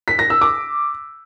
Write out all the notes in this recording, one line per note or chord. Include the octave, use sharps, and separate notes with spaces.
B6
A#6
E6
D6